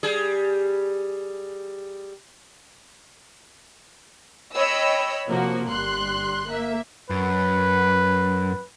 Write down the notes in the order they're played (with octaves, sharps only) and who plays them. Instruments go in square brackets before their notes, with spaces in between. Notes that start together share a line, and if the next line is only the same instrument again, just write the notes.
[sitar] G3 G#4
[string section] C#5 D#5 G5 B5 E6
C3 F3 A#3 F#4
G1 G3 C6 F#6
A#3 E5
[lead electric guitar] F#2 [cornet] B4